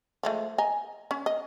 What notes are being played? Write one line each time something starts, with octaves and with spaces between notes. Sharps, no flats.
F3 G#3 A3
D#5 G#5 A#5
C#4
D#5